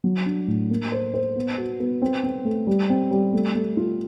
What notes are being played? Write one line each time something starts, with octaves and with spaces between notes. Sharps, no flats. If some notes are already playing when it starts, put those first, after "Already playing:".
F#3
D4
A2
A#3
C5
C5
B3
F#4
B3
C4
C4
A3
G3
C4
G3
A3
A3
F4